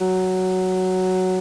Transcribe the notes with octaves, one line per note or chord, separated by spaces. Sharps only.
F#3